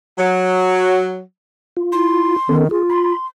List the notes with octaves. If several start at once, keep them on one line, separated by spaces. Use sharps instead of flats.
F#3
F4
E4 C6
D#3 B3 C#4 A4
F4 G#4
B5 C6